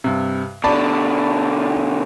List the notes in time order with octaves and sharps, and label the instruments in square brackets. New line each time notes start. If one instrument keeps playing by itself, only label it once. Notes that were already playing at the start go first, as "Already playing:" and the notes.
[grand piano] G2 C3
[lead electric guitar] B2 D3 [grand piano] D5 A5 B5